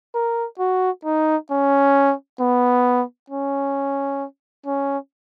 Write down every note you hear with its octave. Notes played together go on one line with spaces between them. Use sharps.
A#4
F#4
D#4
C#4
B3
C#4
C#4